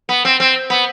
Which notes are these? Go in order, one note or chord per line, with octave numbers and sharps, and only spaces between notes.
B3
C4
C4
B3